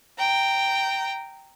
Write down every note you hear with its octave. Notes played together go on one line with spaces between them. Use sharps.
G5 A#5